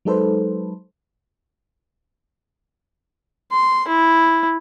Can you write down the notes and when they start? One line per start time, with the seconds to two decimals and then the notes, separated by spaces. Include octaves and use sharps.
0.05 F#3 G#3 D#4 A4 B4 C5
3.52 C6
3.88 E4